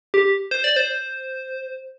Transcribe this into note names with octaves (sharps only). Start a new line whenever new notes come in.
G4
C5
D5
C5